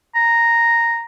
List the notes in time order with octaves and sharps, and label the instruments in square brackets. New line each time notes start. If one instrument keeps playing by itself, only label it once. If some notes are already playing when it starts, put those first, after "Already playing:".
[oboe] A#5